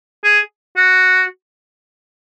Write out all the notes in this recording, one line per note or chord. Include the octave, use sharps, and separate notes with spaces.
G#4
F#4